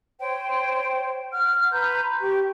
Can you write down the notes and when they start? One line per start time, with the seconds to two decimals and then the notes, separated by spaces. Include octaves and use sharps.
0.19 C5 C#5 G5
1.31 F#5 F6
1.71 B4 A#5 C6 G6
2.20 G4 C#6